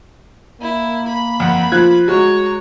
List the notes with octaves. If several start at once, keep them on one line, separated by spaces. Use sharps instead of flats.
A#3 E4
B5
F2 F#5
F3 F4 F#6 G#6
G#3 F#4 C#5 A#5